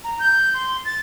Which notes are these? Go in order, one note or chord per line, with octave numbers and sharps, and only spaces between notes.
A#5
G6
C6
A6